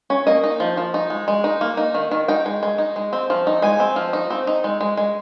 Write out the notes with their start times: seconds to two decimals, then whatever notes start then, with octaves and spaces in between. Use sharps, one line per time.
0.10 C#4
0.27 A#3 D#5
0.43 D#4
0.60 F3
0.77 F3
0.94 D#4
1.10 G#3
1.28 G#3
1.44 D#4
1.61 A#3
1.77 D#4
1.94 D#3
2.11 D#3
2.28 D#4 G5
2.46 G#3
2.63 G#3
2.78 D#4
2.96 G#3
3.13 C4
3.30 F3
3.47 D#4
3.62 G#3 G#5
3.80 C4
3.96 F3
4.13 D#4
4.30 C4
4.47 D#4
4.64 G#3
4.81 G#3
4.97 G#3